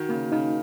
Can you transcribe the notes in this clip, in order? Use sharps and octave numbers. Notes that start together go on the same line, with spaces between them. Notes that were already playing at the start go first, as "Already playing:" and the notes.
Already playing: D#3 F#4
C#3 A#3
C#3 D#4